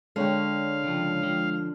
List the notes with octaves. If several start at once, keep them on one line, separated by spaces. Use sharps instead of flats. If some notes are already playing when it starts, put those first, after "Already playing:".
D3 G#3 C#5 F5 G5
C#3 F3
F3